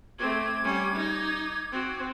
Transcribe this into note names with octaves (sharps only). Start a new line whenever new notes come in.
A3 C4 D6 G#6
G3 C#4
D#4
C4 F#4